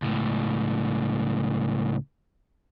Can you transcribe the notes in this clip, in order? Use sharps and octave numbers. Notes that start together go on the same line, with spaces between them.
C#2 A2